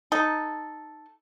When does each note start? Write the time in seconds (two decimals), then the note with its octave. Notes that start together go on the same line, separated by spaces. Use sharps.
0.12 D#4 A4